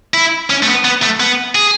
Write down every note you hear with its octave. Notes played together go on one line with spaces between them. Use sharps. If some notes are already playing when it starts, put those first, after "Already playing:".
E4
C#4
A3
B3
B3
A3
B3
G#4